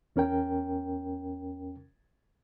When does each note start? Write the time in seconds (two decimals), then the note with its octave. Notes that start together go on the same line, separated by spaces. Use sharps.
0.16 E2 C#4 A#4 G5